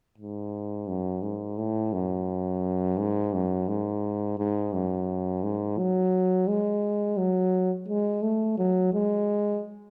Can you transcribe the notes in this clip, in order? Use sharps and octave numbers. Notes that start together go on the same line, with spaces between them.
G#2
F#2
G#2
A2
F#2
G#2
F#2
G#2
G#2
F#2
G#2
F#3
G#3
F#3
G#3
A3
F#3
G#3